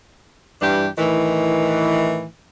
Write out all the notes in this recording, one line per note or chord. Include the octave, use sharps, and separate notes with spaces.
G2 E3 D4 G4
A2 D#3 E3